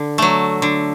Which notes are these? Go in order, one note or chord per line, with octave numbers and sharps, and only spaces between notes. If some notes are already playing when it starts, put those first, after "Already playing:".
Already playing: D3
F#3 A3
D3